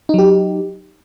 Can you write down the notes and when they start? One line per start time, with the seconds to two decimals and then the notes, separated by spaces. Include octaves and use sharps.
0.09 D#4
0.14 F#3
0.18 G4